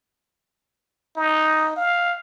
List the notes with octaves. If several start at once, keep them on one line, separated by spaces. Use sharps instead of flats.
D#4
F5